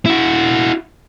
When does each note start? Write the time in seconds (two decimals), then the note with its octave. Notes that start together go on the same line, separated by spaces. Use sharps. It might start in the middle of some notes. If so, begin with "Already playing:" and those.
0.06 E4 F#4